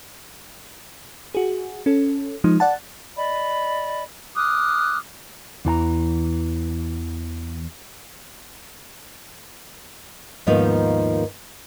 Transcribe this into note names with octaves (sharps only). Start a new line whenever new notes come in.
F#4 G#4
C#4 A4
F3 G#3 D#4
D5 F#5 A5
D5 D#5 B5
D6 D#6 F6 F#6
E2 E3 A5 A#5
D#2 G#2 D#3 F3 B3 F5